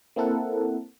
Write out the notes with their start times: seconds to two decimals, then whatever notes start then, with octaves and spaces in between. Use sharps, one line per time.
0.16 A#3 C4 E4 A4 A#4 F#5